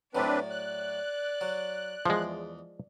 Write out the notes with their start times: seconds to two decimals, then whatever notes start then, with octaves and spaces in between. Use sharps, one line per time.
0.15 A2 F#3 C4 D4 B4 D5
0.50 F#6
1.41 F#3
2.06 E2 F3 G#3